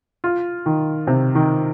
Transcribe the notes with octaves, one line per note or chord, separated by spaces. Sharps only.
F4
D#3
C3
D#3